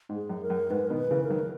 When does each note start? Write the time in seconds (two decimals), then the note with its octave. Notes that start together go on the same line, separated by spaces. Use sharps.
0.09 G#2
0.16 G#4
0.29 F#2
0.43 A#4
0.50 F#2
0.70 G#2 B4
0.87 B2 D#3 A#4
0.97 B4
1.11 C#3 E3
1.24 A#4
1.30 D#3 F#3